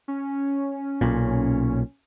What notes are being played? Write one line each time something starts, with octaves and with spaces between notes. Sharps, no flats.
C#4
B1 A#2